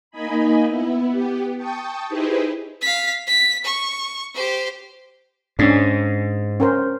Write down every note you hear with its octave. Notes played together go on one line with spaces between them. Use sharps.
A#3 D#4 D#5 G#5 B5
B3 E4
B3 G4
G5 A5 C#6 D#6
D#4 E4 G4 G#4 B4 C5
F5 B6
B6
C#6
G4 C5
G#2 C#4 D4
C#4 A#4 C5